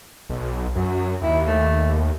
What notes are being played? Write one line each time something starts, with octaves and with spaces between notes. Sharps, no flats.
B1
F#2 F#3
D#2 E4
A3